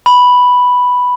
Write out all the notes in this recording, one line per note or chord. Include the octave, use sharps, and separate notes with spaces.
B5